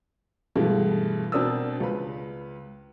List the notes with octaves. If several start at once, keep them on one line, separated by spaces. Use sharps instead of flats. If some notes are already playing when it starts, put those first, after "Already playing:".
G2 B2 E3 G#3 A3
B2 C4 D4 A#4 D#6 E6
C#2 B4